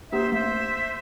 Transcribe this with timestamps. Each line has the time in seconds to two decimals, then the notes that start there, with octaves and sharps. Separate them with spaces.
0.12 A#3 D4 G4 C5 E5
0.32 A3 C5 E5